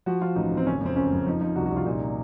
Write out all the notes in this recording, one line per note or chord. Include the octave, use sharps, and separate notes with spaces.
F3 F#4
F3 F4
A1 D#4
A1
C4
F#1 C#4
F2
C4
F#1 C#4
F2
F3 D#4
F3 D#4
C2 F#4
F#4
C2
F4
A#2 D#4